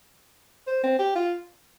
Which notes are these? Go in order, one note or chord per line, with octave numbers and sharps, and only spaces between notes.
C5
C4
G4
F4